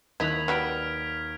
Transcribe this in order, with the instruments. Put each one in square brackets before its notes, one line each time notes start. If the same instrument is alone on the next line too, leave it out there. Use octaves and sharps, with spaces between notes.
[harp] D#2 B5 F#6 [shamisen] E4 D#5 [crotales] G#6 B6 F7
[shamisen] F#3 G3 B4 [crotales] F6 B6 D7